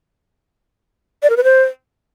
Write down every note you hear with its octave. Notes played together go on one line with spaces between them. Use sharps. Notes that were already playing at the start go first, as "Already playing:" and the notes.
D5
A#4
B4
C5